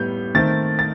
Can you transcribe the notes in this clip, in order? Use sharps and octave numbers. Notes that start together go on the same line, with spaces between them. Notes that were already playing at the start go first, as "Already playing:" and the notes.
Already playing: A2 G3 B3 G6
D#3 A3 C4 A6
A6